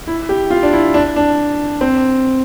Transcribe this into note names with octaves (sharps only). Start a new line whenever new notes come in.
E4
G4
F4
D4
E4
D4
D4
C4